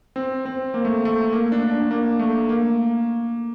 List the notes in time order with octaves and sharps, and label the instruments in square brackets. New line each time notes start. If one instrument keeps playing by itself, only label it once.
[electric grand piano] C4
C4
A#3
A3
A3
A#3
D4
D4
A#3
A3
A#3